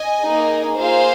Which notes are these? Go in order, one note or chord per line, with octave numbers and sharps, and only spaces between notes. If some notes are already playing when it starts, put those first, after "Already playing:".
Already playing: D#5 G#5
A#3 D#4 G#4
A#3 F4 G#4 C5 F5